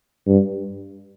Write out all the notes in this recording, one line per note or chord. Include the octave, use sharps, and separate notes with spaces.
G2